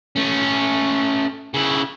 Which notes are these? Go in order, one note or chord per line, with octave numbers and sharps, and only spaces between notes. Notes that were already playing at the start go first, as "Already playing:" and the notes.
A3 C#4
C#3 E4